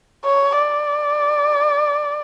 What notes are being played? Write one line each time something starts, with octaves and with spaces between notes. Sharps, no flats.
C#5
D5